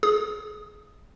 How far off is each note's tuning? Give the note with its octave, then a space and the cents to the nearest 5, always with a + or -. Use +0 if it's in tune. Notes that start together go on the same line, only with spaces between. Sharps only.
G#4 +20 D#6 +0